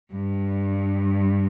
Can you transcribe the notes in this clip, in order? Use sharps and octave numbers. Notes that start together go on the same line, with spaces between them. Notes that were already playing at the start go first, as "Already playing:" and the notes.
G2